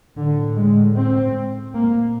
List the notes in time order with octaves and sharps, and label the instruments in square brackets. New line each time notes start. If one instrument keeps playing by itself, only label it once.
[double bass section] A2 D3
G#3
C4
A#2 A#3